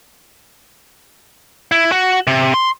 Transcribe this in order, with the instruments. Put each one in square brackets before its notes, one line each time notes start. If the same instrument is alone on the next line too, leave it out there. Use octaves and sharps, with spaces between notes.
[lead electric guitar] E4
F#4
C3
C6